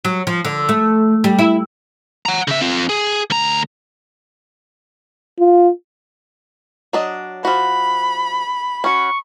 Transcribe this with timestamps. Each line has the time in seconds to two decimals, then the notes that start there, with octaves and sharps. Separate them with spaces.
0.05 F#3
0.27 F3
0.45 D3
0.69 A3
1.24 G3
1.39 E4
2.26 F#5 A#5
2.47 C#3 E5
2.61 C4 F4
2.89 G#4
3.30 D2 A#5
5.39 F4
6.93 F#3 D4 D#5
7.45 F3 F#4 B5
8.84 C#4 F#4 C#6